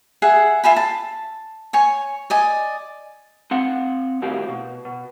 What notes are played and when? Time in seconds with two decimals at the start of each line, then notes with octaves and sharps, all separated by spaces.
0.22 G#4 E5 F#5
0.64 F4 E5 G#5 B5
0.76 A5
1.73 C#5 G#5 C#6
2.30 D5 D#5 G#5
3.51 C4 F5 F#5
4.22 D#2 A2 F#4 G4 F5
4.49 B2
4.85 B2